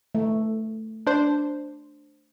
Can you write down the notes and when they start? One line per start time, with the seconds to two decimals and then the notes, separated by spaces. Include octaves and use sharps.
0.15 A3
1.07 D4 C5